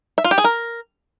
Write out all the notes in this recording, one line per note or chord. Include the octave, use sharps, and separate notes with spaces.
E5
F4
G4
G#4
A#4